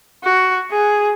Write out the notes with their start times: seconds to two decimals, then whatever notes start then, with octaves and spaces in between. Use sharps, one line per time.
0.24 F#4
0.71 G#4